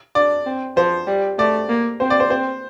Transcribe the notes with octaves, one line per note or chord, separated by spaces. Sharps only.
D4 D5
C4
F3 C5
G3
A3 D5
A#3
C4 C5
D5
C5
C4 C5